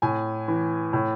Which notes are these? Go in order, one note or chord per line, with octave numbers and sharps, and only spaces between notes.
A2 G#5
E3
A2